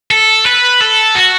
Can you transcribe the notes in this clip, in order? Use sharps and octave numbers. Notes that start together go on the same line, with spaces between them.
A4
B4
A4
F#4